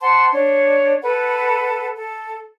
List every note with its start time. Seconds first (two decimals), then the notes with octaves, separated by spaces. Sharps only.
0.01 C5 F#5 A5 C6
0.32 D4 C#5
1.02 A4 B4 F#5
1.96 A4